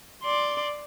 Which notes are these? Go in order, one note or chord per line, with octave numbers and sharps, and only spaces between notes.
D5 C6